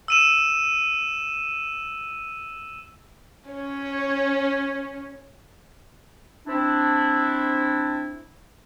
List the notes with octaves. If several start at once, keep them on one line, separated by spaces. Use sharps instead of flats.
E6 D#7 E7
C#4 C#5
C4 D4 E4